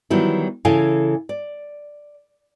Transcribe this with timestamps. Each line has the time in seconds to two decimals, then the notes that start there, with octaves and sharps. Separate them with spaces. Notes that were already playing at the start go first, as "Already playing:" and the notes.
0.10 D#3 E3 F#3 G3 B3 E4
0.65 C#3 E3 E4 A4 F5 G#5
1.29 D5